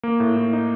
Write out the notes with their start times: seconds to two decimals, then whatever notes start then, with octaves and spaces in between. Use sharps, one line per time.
0.03 A#3
0.20 A2
0.36 A2
0.53 D#4